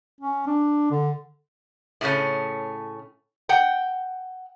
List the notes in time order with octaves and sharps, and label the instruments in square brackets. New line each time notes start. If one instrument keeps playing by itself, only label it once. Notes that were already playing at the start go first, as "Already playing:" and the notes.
[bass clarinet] C#4
D4
D3
[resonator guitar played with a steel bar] A2 C#3 A3 C#4
F#5 G5